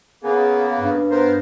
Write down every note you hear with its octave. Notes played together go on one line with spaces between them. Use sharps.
C#3 A#3 B3 G#4
G2
B3 A#4 C5